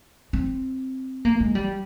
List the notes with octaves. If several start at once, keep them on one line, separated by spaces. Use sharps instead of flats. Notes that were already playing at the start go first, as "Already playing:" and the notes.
C4
A#3
G#3
G3